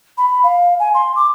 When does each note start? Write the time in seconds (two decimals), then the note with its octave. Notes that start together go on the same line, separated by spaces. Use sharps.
0.18 B5
0.44 F5
0.80 G#5
0.94 C6
1.16 D6